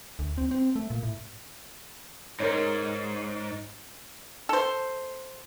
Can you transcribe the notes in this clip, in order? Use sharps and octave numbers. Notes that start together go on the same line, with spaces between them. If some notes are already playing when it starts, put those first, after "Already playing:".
D2
C4
C4
A3
A#2
A2
G#2 C#4 D#4 A#4
A4 C5